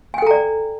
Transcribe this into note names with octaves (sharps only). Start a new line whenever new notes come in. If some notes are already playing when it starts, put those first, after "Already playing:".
A4 D5 G5 G#5 A#5